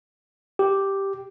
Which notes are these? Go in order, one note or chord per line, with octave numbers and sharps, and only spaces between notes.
G4